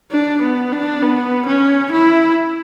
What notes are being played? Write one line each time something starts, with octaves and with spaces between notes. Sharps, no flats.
D4
B3
D4
B3
C#4
E4